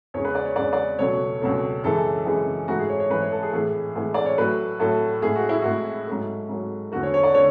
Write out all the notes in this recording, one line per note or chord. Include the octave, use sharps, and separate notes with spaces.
E2 C#3 G#3 C#5
B4
D5
C#5
E2 C#3 G#3 D5
D5
C#2 B2 F#3 A3 C#5
C#2 B2 F#3 A3
F#2 C#3 E3 G#3 A4
F#2 C#3 E3 G#3
G#2 E3 A3 F#4
G#4
C#5
C#5
G#2 E3 A3 B4
C#5
A4
G#4
A2 E3 G#3 G#4
A2 E3 G#3
D5
C#5
A2 F#3 A3 B4
A2 F#3 A3 A4
A2 G#3 G#4
F#4
E4
A2 G#3 F#4
G#2 F#3 A3
G#2 F#3 A3
E2 D3 A3 F#4
C#5
C#5
D5
D3 A3 C#5